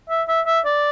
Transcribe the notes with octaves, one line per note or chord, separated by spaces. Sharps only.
E5
E5
E5
D5